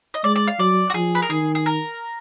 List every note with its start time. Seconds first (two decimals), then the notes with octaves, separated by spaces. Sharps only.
0.14 D#5
0.24 G#3 D5
0.36 D5
0.48 F5
0.59 F#3 D5
0.90 F#4
0.94 F3 G#4
1.15 B4
1.22 A#4
1.30 D#3 G#4
1.55 G#4
1.66 A#4